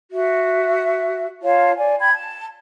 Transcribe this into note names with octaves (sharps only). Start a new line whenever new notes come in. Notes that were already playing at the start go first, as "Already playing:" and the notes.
F#4 E5
F4 C#5 F5 A5
D5 G#5
G5 B5 G#6
A5